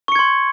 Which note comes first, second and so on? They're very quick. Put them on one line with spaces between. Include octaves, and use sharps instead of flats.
C#6 C#7 G#6 C6